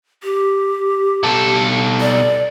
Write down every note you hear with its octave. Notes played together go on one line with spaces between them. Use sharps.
G4
B2 A4
D5